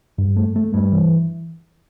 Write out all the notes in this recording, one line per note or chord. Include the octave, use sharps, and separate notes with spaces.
G2
A3
A3
G2
E3